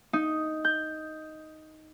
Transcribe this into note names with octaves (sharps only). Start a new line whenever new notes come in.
D#4
G6